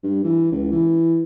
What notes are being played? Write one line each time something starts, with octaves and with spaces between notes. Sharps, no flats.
G2
E3
C#2
E3